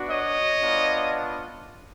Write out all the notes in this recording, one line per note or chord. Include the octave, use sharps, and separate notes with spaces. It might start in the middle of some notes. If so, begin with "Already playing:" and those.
Already playing: B3 D4 F#4
C#5 D#5
B3 D4 F4